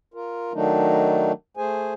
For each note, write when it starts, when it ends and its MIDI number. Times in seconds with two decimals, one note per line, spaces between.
0.14 0.53 65
0.14 0.53 70
0.53 1.32 51
0.53 1.32 54
0.53 1.32 57
0.53 1.32 62
0.53 1.32 63
1.57 1.94 57
1.57 1.94 68
1.57 1.94 72
1.57 1.94 80